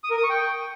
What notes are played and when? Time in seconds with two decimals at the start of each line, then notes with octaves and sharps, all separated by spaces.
0.04 D#6
0.10 A#4
0.17 D#6
0.23 C#6
0.30 G5